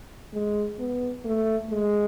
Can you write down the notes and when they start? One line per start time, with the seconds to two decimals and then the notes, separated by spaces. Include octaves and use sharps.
0.34 G#3
0.79 B3
1.25 A3
1.70 G#3